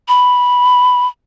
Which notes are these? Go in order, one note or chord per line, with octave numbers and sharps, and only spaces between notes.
B5